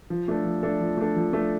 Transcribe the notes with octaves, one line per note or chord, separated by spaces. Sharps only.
F3
A3 D4 A4
F3
A3 D4 A4
F3
A3 D4 A4
F3
A3 D4 A4